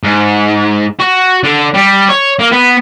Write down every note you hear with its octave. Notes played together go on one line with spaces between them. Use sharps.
G#2
F#4
D3
G3
C#5
A#3
B3